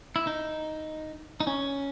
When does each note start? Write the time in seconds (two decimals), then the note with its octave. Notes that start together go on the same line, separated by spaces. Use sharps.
0.16 E4
0.27 D#4
1.40 D#4
1.47 C#4